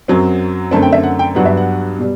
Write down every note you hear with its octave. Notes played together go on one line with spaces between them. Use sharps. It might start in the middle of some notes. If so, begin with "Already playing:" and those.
F#2 F#3 C4
F#2 D3 A3 C4 A5
G5
E5
F#5
G5
G2 F#3 B3 F#5
E5
F#5
B2 G3